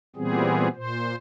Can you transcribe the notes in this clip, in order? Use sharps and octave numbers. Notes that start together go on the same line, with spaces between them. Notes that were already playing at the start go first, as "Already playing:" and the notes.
A#2 E3 G3 B3 C4 G#4
A#2 C5